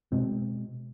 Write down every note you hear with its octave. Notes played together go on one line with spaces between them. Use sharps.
B2 G#3 C4